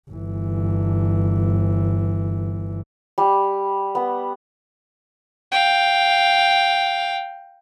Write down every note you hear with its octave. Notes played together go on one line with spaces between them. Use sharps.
G1 E3
G3
B3
F5 G5